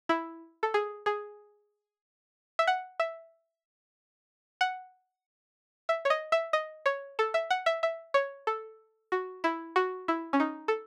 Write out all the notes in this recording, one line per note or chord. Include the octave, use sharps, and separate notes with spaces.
E4
A4
G#4
G#4
E5
F#5
E5
F#5
E5
C#5
D#5
E5
D#5
C#5
A4
E5
F#5
E5
E5
C#5
A4
F#4
E4
F#4
E4
C#4
D#4
A4